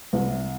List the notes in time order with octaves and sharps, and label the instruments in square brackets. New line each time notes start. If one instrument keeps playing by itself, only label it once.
[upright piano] C2